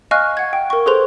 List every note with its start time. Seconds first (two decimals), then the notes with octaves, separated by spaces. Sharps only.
0.11 D#5 F5 G#5 C#6 F6 F#6
0.37 F#5 G#6
0.53 G5
0.70 A#4 C#6
0.86 G#4 A4 B4 C5 C6 F7